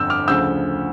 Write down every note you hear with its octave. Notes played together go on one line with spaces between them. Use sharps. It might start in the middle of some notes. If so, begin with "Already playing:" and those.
Already playing: G1 F2 D3 E6 G6
D6 F6
D2 C#3 F3 E6 G6